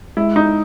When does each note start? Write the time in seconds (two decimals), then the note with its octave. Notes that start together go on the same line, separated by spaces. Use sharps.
0.17 G#3 E4
0.36 D#4